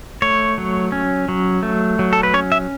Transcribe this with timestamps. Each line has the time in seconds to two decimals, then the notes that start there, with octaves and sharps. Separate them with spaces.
0.22 A3 C#5
0.58 F#3
0.92 C#4
1.29 F#3
1.63 A3
1.99 F#3
2.13 A4
2.23 B4
2.34 C#4 C#5
2.52 E5